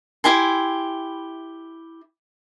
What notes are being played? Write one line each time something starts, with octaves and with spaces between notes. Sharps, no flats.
E4 G4 G#5 C6